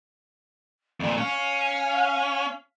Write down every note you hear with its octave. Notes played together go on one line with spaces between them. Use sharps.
F2 A#2 D5
C#4 F5